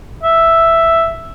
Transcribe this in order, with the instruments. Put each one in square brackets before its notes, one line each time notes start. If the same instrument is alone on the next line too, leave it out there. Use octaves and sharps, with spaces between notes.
[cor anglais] E5